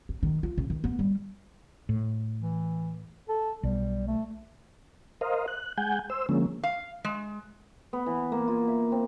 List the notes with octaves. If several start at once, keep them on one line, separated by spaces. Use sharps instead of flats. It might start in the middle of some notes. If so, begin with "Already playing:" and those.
C4
D#3
F4
C#3
D#3
B3
G3
A2
E3
A4
B1 G3
A3
A#4 C5 D#5 F5
F#6
G#3 F#5 G#5 G6
C5 E6
D3 F3 G#3 A#3 C#4
F5
G#3
B3
E3
A#3
F4
E5
C4